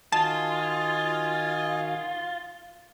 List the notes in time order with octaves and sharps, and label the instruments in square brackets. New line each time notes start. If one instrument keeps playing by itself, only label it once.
[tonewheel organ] D#3 F#4 [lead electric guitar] F4 [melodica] D#5 G#5 [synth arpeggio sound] A5